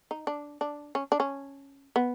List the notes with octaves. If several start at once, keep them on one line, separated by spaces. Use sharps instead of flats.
D#4
D4
D4
C#4
D4
C#4
B3